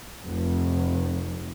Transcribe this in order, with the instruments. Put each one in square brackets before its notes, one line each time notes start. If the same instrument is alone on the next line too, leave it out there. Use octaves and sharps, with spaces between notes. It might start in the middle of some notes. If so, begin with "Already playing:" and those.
[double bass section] F1